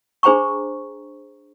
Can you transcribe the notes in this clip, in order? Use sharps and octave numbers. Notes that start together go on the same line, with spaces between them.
D4 G#4 C5 G5 A#5 C#6